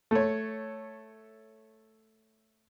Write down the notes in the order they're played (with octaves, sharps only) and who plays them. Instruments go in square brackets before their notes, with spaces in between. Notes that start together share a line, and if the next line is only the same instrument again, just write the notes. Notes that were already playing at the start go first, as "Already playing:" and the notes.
[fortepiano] A3 C#5